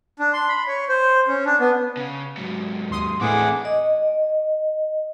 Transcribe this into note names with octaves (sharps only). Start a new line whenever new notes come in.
D4
C6
B5
C#5
C5
C#4
D4
B3
C#3
G#2 F#3
D#2 C6 D#6
A2 E3 A3 C4 D4 G#4 F#5 D6
D#5